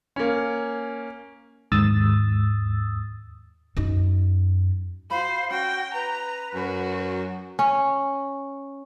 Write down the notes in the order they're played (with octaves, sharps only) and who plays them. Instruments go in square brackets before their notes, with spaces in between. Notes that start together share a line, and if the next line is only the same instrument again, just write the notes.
[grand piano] A#3 C#4
[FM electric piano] D#2 G#2 D#6 E6 A6
[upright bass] F#2 D#4
[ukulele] F#4 B5 [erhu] C5 [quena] F5
[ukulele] C#4 [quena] F#4 [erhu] G5
[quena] B4 [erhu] A#5
[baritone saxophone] F#2 [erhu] F#4
[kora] C#4